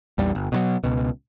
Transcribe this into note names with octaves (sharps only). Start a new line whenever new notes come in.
A#1 E2 G3
G1
B2 D#3 F#3
C#2 B2